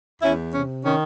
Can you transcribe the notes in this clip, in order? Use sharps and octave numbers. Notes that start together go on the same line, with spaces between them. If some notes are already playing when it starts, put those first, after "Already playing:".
E2 C#4 E4
C3 C#4
D#3 C#4